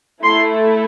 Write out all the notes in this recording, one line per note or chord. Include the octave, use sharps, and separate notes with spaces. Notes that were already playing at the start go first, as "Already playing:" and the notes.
A3 E4 A4 C6